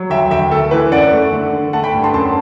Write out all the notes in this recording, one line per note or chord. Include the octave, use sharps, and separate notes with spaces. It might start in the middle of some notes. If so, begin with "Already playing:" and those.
Already playing: F#3
D2 E5 G5
D2 E5 G5
A3 A4
E3 B4
F#2 D5 F#5
A3
D3
D3
A3 F#5 A5
G5 B5
G2
A5 C6
F#2 A5 C6